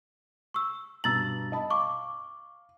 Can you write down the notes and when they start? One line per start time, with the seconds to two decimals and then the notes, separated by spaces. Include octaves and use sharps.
0.54 C#6 E6
1.04 G2 B2 A#5 E6 A6 F#7
1.52 D#5 A5 B5
1.70 F5 C#6 D6